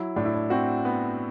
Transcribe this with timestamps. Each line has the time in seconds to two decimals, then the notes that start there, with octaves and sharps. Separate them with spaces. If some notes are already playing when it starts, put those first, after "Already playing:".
Already playing: F#3 E4
0.16 A2 D4
0.25 E4
0.34 D4
0.50 C4 F#4
0.85 B3